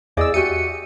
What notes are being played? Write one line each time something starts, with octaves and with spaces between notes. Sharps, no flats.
E2 G#4 D5 D#5 E6
F#4 G4 E5 C#7 D#7